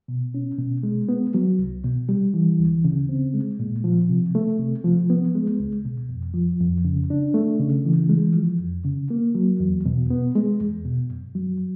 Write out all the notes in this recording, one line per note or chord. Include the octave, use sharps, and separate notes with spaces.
B2
C#4
B2
G#3
B3
F#3
C2
B2
G3
E3
D2
C#3
C4
G#3
A#2
F3
C3
A3
C3
F3
B3
G#3
C#2
B2
F2
F3
F2
C#3
D4
A3
C#3
E3
G#3
F3
F2
C#3
A#3
F#3
E2
B2
B3
G#3
E2
B2
F#2
F#3